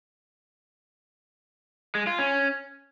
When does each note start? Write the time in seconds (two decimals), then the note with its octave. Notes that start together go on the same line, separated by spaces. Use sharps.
1.95 G#3
2.07 F4
2.19 C#4